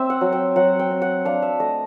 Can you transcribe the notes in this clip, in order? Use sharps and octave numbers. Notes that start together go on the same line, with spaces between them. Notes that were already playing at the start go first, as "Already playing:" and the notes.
Already playing: C4 E5
F#5
F#3
G5
F#3 F#5
G5
C4
F#5
D4 F5
E5
A3 D#5